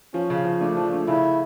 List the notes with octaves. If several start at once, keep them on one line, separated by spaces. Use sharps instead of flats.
F3 C#4
C#3
F3
A3 D4
F3
A3
C#3 E4